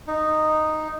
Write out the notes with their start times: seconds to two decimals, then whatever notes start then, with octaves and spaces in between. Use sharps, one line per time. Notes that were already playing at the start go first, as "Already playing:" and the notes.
0.07 D#4